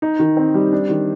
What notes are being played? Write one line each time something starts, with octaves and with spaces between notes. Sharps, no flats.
D#4
D#3
C4
G3
D4
D#3